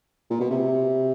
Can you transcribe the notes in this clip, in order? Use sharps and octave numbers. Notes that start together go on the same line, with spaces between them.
A#2
B2
C3